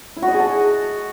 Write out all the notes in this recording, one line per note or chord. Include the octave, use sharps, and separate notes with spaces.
E4
F#4
D#5
G#4
A5